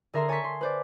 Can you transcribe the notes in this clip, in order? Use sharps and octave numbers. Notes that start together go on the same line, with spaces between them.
D3 G#4 A#4 E5 A#5 C6
C#5 G#5 A5 C6 C#6 B6
C6
B4 C5 D5